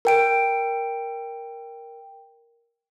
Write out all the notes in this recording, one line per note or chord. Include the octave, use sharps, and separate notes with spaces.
A#4 G5 D7